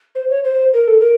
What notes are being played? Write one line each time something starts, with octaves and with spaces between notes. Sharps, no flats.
C5
C#5
C5
A#4
A4
A#4